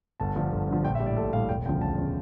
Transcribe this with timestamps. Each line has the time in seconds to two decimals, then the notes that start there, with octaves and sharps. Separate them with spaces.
0.20 G1 A5
0.36 G2 D3 F3
0.51 G1
0.68 G2 D3 F3
0.84 A#1 G5
0.95 E5
1.00 G3
1.05 A2 D5
1.17 A#1 A4
1.33 A2 G3 F5
1.49 E1 G5
1.66 D2 C#3 F3 G5
1.81 E1 A5
1.98 C#3 F3